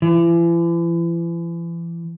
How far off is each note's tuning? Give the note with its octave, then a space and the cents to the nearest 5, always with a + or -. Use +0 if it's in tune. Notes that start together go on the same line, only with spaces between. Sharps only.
E3 +40